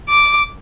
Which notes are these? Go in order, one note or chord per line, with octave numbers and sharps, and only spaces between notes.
D6